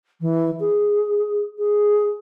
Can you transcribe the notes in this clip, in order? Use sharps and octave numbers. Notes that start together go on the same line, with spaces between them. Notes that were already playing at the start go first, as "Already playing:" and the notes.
E3
G#4
G#4